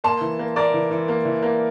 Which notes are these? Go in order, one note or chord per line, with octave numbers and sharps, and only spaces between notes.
A#3 A5 C6
E3
A#3
A#3 A#4 D5
E3
E3
A#3
E3
A#3